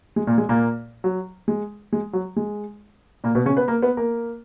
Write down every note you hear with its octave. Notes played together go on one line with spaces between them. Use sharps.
G#3
A#2 A#3
G#3
A#2 A#3
F#3
G#3
G#3
F#3
G#3
A#2 A#3
B2 B3
C#3 C#4
B3 B4
A#3 A#4
B3 B4
A#3 A#4